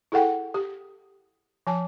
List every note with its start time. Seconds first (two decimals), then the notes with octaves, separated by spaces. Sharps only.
0.12 E4 G#4 A4 F#5 G5
0.54 G4
1.67 F3 G#5 A5